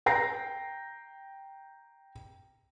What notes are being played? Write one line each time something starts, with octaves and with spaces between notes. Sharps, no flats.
G5 A#5 A#6 C7